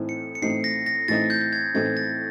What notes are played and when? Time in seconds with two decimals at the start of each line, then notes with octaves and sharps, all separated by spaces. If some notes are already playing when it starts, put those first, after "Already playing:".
Already playing: A2 E3 A3 C4 D#4
0.09 C#7
0.35 C#7
0.42 A2 E3 A3 C4 D#4 C7
0.64 A#6
0.86 A#6
1.08 A2 E3 A3 C4 D#4 A6
1.30 G6
1.53 G#6
1.74 A2 E3 A3 C4 D#4 G#6
1.97 A6